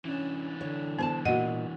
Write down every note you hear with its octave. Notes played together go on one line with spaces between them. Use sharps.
E3 C#4 D4
D3 C#5
B3 C5 G#5 A5
A#2 E4 F#4 D#5 F#5